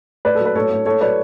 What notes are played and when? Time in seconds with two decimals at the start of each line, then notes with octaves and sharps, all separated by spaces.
0.25 A2 B4 D5
0.35 F#3 A4
0.46 B4
0.55 A2 A4 C#5
0.71 A2
0.86 A2 A4 C#5
1.01 F#3 B4 D5